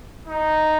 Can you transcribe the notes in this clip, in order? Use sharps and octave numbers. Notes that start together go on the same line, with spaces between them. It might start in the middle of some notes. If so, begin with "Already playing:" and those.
D#4